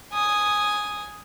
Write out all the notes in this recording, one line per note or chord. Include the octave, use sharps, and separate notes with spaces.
G#5 D#6